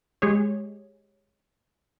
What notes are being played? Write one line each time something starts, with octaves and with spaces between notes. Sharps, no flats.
G#3 G4 G#4 C#5